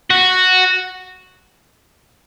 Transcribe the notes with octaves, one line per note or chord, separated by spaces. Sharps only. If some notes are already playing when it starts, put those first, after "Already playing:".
F#4